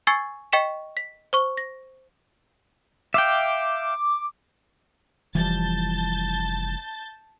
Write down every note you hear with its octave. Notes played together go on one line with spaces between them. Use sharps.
G#5 C#6 E6 G#6 A6 C7
D#5 G5 C#6 B6 C#7 E7
B6
C5 C#6
A#6
E5 F5 G5 D6
F1 E3 F3 G3 A5 G6 A6